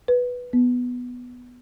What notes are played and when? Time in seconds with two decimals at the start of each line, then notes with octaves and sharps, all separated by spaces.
0.08 B4
0.53 B3